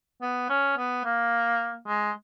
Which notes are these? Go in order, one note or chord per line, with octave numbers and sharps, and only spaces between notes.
B3
C#4
B3
A#3
G#3